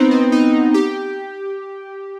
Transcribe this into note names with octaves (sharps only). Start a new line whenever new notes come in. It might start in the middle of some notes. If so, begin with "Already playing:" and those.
Already playing: B3 C4 D#4
C4
D#4
G4